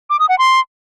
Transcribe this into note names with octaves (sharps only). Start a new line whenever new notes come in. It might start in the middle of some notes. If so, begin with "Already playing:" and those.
D6
D#6
F#5
C6